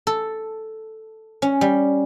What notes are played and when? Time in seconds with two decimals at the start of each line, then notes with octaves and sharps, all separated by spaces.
0.07 A4
1.42 C#4
1.61 G3